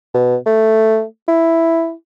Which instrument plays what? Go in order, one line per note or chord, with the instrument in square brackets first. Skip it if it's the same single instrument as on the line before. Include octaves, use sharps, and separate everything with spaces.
[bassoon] B2
A3
E4